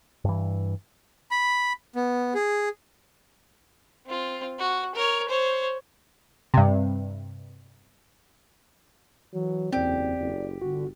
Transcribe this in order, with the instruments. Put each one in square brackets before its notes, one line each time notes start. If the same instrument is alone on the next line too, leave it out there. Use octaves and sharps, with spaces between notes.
[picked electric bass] G2 E3
[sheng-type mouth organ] B5
B3
G#4
[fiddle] C4 F4
F#4
A#4 C#5
C5 C#5
[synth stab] G2 C3
[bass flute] E3 [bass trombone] F#3
[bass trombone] F#1 [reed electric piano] E2 C4 [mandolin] G4 [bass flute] D5
[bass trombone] F#1
[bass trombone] G1 [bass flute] D3 [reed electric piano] F#4